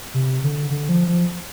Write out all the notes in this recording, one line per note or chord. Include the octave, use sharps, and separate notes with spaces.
C3
D3
D3
F3
F3